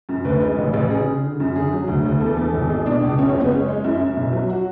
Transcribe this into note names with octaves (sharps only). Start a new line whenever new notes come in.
F#2
D2 B4
G#3
A1
A1
C#3 G#4
C#3
D3
F#2
D3 G#4
F#3
D2
D2
E2 A4
E2
G#1
G#3
B2 D4
C#2
F#2 C#4
C#4
F#1
B3
G#3 C#4
G#3
F#2 E4
F#2
B1
F#3
F#4